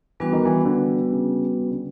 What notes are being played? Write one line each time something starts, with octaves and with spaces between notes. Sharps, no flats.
E3 G3 B3 D4 F#4 B4
D#3
E3
D3
C#3
C#3
D3